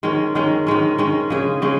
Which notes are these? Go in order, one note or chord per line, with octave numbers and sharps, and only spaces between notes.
D#3 G#3 C#4
D#3 G#3 C#4
D#3 G#3 C#4
D#3 G#3 C#4
C#3 G#3 C#4 G#4
C#3 G#3 C#4 G#4